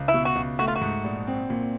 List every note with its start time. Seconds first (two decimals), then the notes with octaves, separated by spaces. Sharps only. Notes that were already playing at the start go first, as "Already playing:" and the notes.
Already playing: C#2
0.08 E4
0.14 B2
0.25 F#4
0.36 C#2
0.59 A3 F#4
0.68 F4
0.75 F#4
0.81 G#2
1.04 A#1
1.27 C4
1.50 A#2